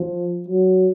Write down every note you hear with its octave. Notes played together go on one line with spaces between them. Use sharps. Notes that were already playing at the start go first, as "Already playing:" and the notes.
Already playing: F3
F#3